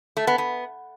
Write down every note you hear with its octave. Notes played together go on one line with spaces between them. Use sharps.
A3
B3
B3